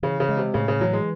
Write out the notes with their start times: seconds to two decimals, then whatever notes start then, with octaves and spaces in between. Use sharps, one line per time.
0.02 C#3 E3
0.20 C#3
0.29 G#3
0.37 C3
0.54 A2 C#3
0.68 C#3
0.80 E3 F#3
0.93 G#3